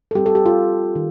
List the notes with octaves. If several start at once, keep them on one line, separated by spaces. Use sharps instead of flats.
A4
G3 C4 D#4 G4
A4
G4
F4
D#3